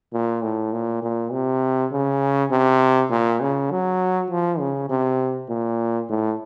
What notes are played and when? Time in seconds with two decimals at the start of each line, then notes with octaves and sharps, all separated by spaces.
0.13 A#2
0.43 A2
0.73 A#2
1.02 A#2
1.32 C3
1.92 C#3
2.51 C3
3.11 A#2
3.41 C#3
3.71 F#3
4.30 F3
4.59 C#3
4.89 C3
5.49 A#2
6.09 A2